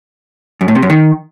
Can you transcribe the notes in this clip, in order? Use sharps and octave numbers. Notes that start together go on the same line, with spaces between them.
F#2
A2
C3
F#2
D#3